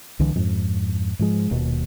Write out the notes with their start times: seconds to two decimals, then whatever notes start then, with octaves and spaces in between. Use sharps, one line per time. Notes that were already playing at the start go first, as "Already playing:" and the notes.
0.19 C2 D3 E3
0.35 F2 G#2
1.19 G#2 F3 G#3
1.50 D#1 D#2 B2